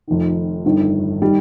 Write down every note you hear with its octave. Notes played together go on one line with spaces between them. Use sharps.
F1 F2 D#3
G1 G2 D#3
D#3 G3